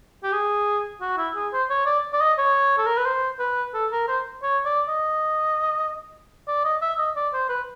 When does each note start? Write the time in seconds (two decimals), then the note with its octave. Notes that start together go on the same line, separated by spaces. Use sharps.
0.23 G4
0.32 G#4
1.01 F#4
1.17 E4
1.36 G#4
1.53 C5
1.70 C#5
1.86 D5
2.13 D5
2.21 D#5
2.38 C#5
2.78 A4
2.87 A#4
2.97 B4
3.06 C5
3.39 B4
3.74 A4
3.92 A#4
4.08 C5
4.43 C#5
4.65 D5
4.88 D#5
6.48 D5
6.64 D#5
6.82 E5
6.99 D#5
7.16 D5
7.33 C5
7.49 B4